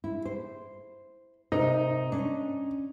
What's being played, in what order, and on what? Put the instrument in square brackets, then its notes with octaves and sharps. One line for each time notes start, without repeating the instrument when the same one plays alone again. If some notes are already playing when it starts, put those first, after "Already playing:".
[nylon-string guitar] E4
C5
[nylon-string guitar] C3 A#4 D#5 [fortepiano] D#4
[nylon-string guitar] C#4 D4